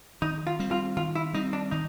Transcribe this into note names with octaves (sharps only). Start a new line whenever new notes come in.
D#3 D#4
F4
G3 C4
F4
D#3 F4
E4
G3 C4 D#4
D4
D#3 D#4